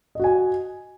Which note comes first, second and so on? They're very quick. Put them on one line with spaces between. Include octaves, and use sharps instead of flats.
D#5 F#4 G#5